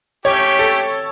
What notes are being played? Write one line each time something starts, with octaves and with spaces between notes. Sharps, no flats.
A3 C#4 G4 C#5
A4